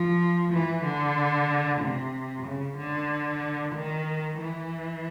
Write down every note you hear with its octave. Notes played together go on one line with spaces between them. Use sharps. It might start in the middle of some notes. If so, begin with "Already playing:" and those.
Already playing: F3
E3
D3
C3
C#3
D3
D#3
E3